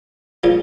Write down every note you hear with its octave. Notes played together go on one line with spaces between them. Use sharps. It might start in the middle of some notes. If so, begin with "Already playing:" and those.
A#2 F3 G#3